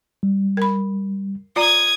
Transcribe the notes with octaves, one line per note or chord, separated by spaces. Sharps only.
G3
A#4 B5
F4 D5 A#5 D#6 G#6